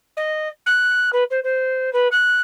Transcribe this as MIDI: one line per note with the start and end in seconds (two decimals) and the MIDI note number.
0.17 0.49 75
0.66 1.10 90
1.13 1.24 71
1.31 1.40 72
1.44 1.93 72
1.93 2.08 71
2.12 2.42 90